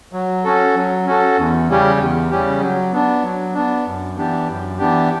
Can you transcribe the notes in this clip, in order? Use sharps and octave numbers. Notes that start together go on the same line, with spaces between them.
F#3
C#4 F#4 A4
F#3
C#4 F#4 A4
E2
C#3 G3 C#4 G4
E2
C#3 G3 C#4 G4
F#3
B3 D4
F#3
B3 D4
F#2
E3 B3 D4 G4
F#2
E3 B3 D4 G4